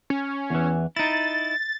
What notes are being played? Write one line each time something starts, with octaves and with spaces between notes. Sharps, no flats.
C#4
E2 E3
D#4 E4 A6